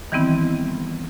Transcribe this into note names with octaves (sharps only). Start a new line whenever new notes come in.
D#3 E3 G3 B3 C4 E4